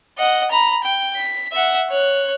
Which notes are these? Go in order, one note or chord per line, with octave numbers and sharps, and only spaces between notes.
D#5 F#5
A#5 B5
G5
B6
E5 F#5
C#5 F#6